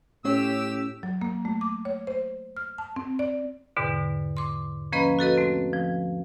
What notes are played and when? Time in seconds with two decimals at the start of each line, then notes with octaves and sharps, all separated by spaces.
0.25 A2 A3 C#4 G4 C#5 E6
1.03 F#3
1.21 A#3
1.45 A3
1.61 D6
1.85 C#5
2.07 C5
2.57 F6
2.78 A5
2.96 C4
3.19 D5
3.76 E2 G#2 B2 D3
4.37 C6 D6
4.92 F3 A#3 C#4 B4 D#5 B5
5.19 F#4 A4 B4 D#5
5.38 A3 C4
5.73 F3